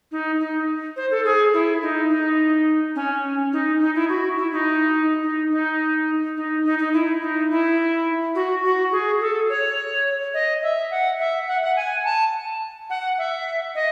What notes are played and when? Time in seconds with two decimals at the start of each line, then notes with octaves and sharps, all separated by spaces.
0.12 D#4
0.40 D#4
0.96 C5
1.11 A4
1.25 G#4
1.54 E4
1.82 D#4
2.10 D#4
2.95 C#4
3.53 D#4
3.81 D#4
3.95 E4
4.09 F#4
4.38 E4
4.52 D#4
5.23 D#4
5.51 D#4
6.37 D#4
6.65 D#4
6.79 D#4
6.93 E4
7.21 D#4
7.50 E4
8.35 F#4
8.64 F#4
8.92 G#4
9.21 A4
9.49 C#5
10.34 D#5
10.63 E5
10.91 F#5
11.19 E5
11.48 F#5
11.62 F#5
11.76 G#5
12.05 A5
12.90 F#5
13.18 E5
13.75 D#5